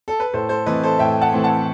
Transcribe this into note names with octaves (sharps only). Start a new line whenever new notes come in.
A4
B4
A2 A4 C5
A4 C5
E3 A3 C4 B4 D#5
A4 C5
A2 E5 G5
F#5 A5
E3 A3 C4
F#5 A5